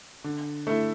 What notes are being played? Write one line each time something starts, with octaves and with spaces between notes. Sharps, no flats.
D3
A3 E4